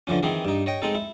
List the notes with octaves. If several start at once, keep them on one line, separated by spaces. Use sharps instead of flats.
D3 E3 F3 C#4
D#3 E3 C4 G#4
G2 D#4
C#5 D#5 G5
G#3 C4 D#4 A4
E4